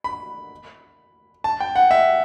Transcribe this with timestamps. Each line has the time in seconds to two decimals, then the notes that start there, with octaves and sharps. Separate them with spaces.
0.04 B5
1.44 A5
1.60 G5
1.76 F#5
1.91 E5